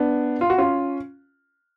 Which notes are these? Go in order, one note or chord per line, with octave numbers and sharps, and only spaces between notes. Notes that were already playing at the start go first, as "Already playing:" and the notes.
Already playing: B3 D4
F4
F#4
C#4 F4